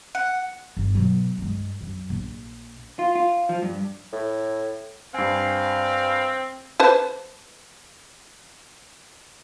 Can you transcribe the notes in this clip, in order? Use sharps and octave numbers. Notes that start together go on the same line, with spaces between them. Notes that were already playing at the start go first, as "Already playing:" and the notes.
F#5
G1
B2 F#3
G2 G#3
F#2
A#1
F4
F4
F3
G2
A2
G2 C4 F5 G#5
B4 C5 A5